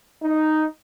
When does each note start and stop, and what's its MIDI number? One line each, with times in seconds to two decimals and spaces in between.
0.22 0.64 63